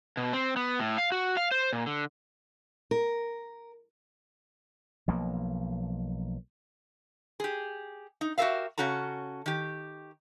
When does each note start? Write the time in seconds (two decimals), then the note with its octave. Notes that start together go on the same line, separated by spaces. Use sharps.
0.17 B2
0.33 C4
0.56 B3
0.80 A2
0.98 F5
1.12 F#4
1.37 F5
1.51 C5
1.73 A#2
1.86 D3
2.91 A#4
5.08 B1 F3 A#3
7.40 G4 G#4
8.21 D#4
8.38 F#4 G4 A4 A#4 E5 F5
8.78 C#3 C#4 F#4 A4 A#5
9.46 D#3 G4